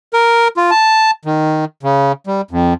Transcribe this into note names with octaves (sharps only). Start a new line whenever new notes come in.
A#4
F4
A5
D#3
C#3
G3
F2